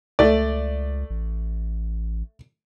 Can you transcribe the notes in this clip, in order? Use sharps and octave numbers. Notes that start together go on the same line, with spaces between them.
C#2 A3 D5
A1